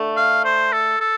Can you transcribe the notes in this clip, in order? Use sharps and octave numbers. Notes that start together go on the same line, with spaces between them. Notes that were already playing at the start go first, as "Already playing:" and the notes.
Already playing: D3 A3
F5
C5
A4
A4